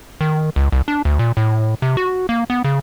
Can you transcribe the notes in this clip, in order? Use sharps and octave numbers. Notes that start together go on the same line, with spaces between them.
D#3
C#2
C2
D4
D2
A#2
A2
C3
F#4
A#3
B3
C#3